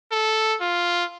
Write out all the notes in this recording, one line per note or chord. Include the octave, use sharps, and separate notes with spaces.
A4
F4